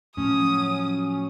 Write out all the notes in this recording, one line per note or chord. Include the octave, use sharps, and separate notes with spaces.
A2 F3 F#3 A3 C#4 D#6